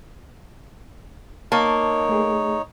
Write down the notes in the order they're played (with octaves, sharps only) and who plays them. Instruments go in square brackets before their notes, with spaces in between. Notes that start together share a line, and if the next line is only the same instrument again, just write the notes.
[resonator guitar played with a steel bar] A#3 [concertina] D#4 C#5 [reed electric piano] A5 A#5 C#6
[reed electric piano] A3 G#4